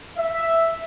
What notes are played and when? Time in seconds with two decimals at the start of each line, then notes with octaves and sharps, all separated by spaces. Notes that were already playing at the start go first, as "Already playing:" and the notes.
0.17 E5